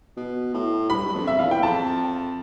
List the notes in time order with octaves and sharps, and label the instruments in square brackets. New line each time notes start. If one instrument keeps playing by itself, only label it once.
[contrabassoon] B2
A2
[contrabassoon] G2 [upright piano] B5
[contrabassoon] G2
F2
[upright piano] E5
[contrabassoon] E2 [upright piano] F5
[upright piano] G5
[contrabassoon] F2 [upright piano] A5